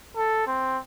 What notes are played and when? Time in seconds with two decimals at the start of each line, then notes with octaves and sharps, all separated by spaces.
0.16 A4
0.47 C4